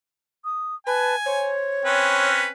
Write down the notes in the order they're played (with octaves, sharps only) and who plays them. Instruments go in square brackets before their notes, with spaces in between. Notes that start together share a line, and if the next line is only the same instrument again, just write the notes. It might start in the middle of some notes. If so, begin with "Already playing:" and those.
[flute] D#6
[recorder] B4 [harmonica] G#5 [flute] A5
[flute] C5 [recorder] C#5
[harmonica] C4 C#4 B4 [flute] F#6